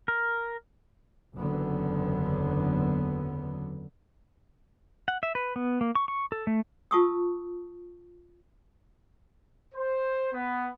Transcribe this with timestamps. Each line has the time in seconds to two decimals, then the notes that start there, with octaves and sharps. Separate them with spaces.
0.08 A#4
1.35 F#1 E2 D3 F#3 B3
5.08 F#5
5.23 E5
5.35 B4
5.56 B3
5.81 A#3
5.95 C#6
6.08 C#6
6.32 A4
6.47 A3
6.91 F4 A5 C#6 D#6 E6
9.74 C5
10.33 B3